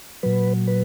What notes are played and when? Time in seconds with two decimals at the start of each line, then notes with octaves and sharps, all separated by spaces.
0.23 A#2 F#3 B4
0.67 B4